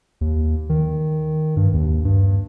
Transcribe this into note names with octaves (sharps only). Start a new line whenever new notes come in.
D#2
D#3
G2
D#2
G2